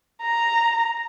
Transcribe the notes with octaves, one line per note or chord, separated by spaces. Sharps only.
A#5